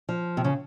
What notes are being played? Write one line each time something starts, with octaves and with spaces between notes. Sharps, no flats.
F3
C3
C#3